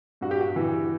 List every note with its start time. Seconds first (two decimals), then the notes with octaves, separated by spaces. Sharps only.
0.21 G2 F#4
0.31 G4
0.41 F#4
0.56 E3